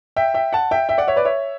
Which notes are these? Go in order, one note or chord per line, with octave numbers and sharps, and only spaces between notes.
E5 G5
E5 G5
F#5 A5
E5 G5
E5 G5
D5 F#5
C#5 E5
B4 D5
C#5 E5